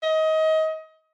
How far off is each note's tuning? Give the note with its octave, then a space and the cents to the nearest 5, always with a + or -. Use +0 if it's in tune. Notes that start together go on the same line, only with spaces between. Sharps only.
D#5 +25